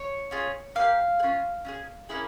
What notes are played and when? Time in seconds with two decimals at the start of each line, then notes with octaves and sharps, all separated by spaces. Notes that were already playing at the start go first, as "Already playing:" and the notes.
Already playing: C#5
0.31 C#4 F4 G#4
0.75 A#3 E4 G4 F5
1.19 G#4
1.23 C#4 F4
1.65 C#4 F4 G#4
2.09 A#3 C#4 E4 G#4